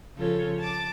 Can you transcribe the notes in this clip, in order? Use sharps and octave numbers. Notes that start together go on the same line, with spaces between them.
C#3 F3 F4 A4 C#5
A5 D6